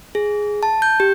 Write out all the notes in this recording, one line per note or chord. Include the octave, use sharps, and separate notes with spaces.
G#4
A5
G6
G4